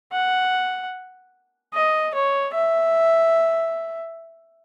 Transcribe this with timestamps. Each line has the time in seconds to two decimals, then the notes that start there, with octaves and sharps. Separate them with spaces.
0.13 F#5
1.74 D#5
2.14 C#5
2.54 E5